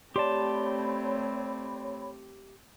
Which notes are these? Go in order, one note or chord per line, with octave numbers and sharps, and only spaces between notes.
A3 C4 G4 C#5 D5 A5 B5 C6